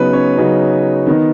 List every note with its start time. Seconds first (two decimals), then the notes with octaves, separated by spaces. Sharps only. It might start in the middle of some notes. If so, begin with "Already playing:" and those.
Already playing: C#3 F#3 B3 D#4 B4
0.13 C#4 C#5
0.37 C#3 F#3 B3 D#4
1.07 D#3 B3 D#4